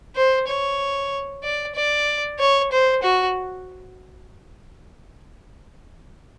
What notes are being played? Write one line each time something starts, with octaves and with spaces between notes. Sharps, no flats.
C5
C#5
D5
D5
C#5
C5
F#4